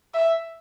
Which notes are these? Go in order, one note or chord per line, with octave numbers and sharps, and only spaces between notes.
E5